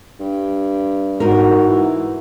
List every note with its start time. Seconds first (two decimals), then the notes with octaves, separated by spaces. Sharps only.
0.20 G2
1.20 G#2 F#4 A#4
1.67 E3